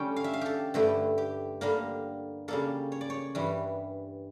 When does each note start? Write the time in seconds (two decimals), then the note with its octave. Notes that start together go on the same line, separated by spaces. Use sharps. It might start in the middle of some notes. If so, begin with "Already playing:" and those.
Already playing: D3 G3 C#4 G5
0.16 F5
0.24 E5
0.33 F5
0.41 G4 A4
0.74 G2 D3 A3 E4 G4
1.18 G4
1.61 D3 G3 A#3
2.48 C#3 G3 A#3 A4
2.92 C#5
3.01 D5
3.10 C#5
3.35 G2 E3 G3